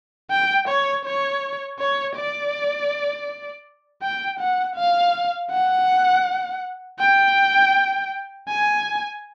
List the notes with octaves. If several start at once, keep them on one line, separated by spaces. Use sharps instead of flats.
G5
C#5
C#5
C#5
D5
G5
F#5
F5
F#5
G5
G#5